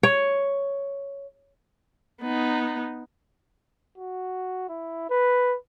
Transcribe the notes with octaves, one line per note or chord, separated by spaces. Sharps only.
C#5
B3 D#4
F#4
E4
B4